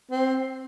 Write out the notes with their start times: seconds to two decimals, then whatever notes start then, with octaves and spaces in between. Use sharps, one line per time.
0.12 C4